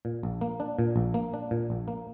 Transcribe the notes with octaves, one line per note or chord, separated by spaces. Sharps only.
A#2
A#1
A#3
D4
A#2
A#1
A#3
D4
A#2
A#1
A#3